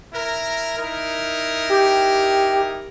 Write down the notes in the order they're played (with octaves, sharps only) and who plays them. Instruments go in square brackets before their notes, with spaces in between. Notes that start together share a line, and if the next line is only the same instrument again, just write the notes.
[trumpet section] E4 A#4
D#4 E4 A#4
[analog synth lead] G4